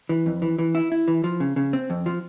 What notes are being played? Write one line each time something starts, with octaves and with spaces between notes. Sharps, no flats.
E3
F2
E3
E3
E4
E4
E3
F3
C#3
C#3
C4
F2
F3